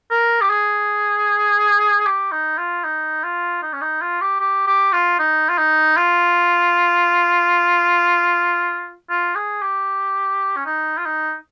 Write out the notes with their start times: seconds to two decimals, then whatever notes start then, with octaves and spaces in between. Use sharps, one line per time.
0.11 A#4
0.41 G4
0.50 G#4
2.06 G4
2.32 D#4
2.58 F4
2.84 D#4
3.23 F4
3.62 D#4
3.73 C#4
3.81 D#4
4.01 F4
4.21 G4
4.40 G4
4.67 G4
4.93 F4
5.19 D#4
5.49 F4
5.58 D#4
5.97 F4
9.09 F4
9.35 G#4
9.62 G4
10.56 C#4
10.66 D#4
10.97 F4
11.05 D#4